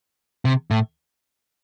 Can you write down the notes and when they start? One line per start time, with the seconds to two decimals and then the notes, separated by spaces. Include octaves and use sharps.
0.45 C3
0.71 A2